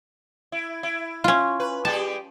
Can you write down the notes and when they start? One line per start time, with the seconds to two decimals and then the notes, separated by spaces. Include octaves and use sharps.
0.52 E4
0.83 E4
1.24 C#4 F4
1.60 B4
1.85 G3 G4 G#4 A5